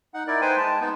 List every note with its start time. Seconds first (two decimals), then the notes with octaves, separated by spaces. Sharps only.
0.14 D#4 F#5
0.27 D#4 E4 A#4 D5
0.41 D#4 B4 C5 G5 G#5
0.57 G#3 A5
0.81 B3 D#4